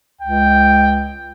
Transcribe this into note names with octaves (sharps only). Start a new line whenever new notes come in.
C#2 G5